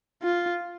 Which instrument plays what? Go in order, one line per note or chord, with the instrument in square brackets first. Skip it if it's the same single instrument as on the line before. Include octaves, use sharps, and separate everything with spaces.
[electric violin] F4